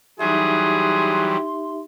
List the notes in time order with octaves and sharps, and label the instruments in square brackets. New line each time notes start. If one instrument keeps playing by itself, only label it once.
[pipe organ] E3 F#3 G3 [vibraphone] D#4 G4 E5 [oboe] G#4 [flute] C6